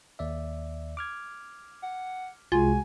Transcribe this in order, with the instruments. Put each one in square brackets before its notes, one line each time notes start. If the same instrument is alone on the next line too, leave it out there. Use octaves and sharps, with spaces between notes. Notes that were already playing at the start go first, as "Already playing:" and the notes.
[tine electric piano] D#2 D5 E5
D6 F6 G#6
[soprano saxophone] F#5
[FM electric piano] C2 G#3 [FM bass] F4 [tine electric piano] F#4 [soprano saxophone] G#5